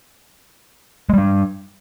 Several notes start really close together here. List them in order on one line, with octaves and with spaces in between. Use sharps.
G#3 G3 D4